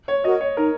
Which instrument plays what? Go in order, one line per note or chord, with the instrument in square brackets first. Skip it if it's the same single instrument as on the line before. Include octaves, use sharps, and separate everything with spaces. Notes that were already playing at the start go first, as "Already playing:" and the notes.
[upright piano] C#5
[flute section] F#4 A#4 [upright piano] D#5
[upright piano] C#5
[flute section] D#4 [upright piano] A#4